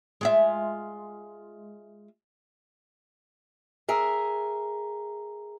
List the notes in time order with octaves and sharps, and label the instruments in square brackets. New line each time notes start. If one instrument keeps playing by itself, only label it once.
[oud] G#3 F4 E5
[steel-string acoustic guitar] G#4 A#4 E5